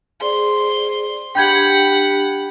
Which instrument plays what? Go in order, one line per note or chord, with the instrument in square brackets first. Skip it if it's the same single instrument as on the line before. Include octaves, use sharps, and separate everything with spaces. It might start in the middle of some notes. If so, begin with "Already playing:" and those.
[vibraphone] G#4 C5 D5 [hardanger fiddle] C6
[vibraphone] D4 G4 [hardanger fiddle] F#5 B5 [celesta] G5 G6 G#6